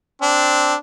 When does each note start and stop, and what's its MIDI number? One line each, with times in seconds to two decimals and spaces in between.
0.22 0.74 60
0.22 0.75 62